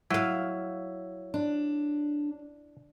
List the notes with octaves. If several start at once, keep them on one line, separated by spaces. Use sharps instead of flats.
F#3 E4 F5
D4